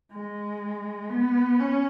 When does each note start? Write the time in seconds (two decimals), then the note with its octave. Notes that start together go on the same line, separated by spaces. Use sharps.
0.12 G#3
1.10 B3
1.59 C#4